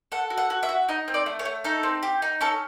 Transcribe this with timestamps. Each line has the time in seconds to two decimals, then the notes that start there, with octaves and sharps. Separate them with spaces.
0.12 A4 F#5
0.30 F#4
0.37 F#5
0.50 F#4
0.63 E5
0.69 F#4
0.88 D#4 D#5
1.08 C4
1.14 D5
1.26 A3
1.39 C#5
1.45 A3
1.64 D#4 A4
1.83 C4
2.03 G4
2.22 D#4
2.41 C#4 A4